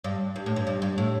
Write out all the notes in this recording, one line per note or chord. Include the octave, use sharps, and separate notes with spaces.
G2
G2
A2
G2
G2
G2
A2